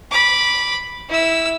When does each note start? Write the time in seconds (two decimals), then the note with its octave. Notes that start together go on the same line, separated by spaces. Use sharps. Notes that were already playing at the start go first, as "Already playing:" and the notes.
0.11 B5 D6
1.09 E4 E6